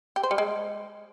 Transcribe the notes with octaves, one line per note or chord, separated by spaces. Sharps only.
G4
C5
G3
G#3